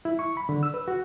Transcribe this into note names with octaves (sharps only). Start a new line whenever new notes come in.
E4
C#6
B5
D3
E6
B4
F#4